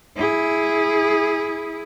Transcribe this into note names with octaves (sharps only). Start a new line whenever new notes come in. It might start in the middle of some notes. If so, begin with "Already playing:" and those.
E4 G#4